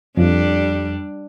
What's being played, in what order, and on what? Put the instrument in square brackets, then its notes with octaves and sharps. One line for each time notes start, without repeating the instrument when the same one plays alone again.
[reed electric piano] F2 [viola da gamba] G3 D4